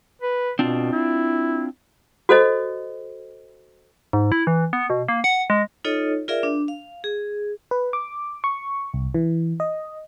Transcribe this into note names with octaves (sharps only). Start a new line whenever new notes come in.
B4
B2 C4 D4 F4
E4
F#4 A4 C5 D#5
G#2
E4
E3
B3
B2
A#3
F#5
G#3
D#4 F4 A4 C#5 D#5
F4 G#4 A#4 D5 E5 F5
D4
F5
G#4
B4
D6
C#6
C2
E3
D#5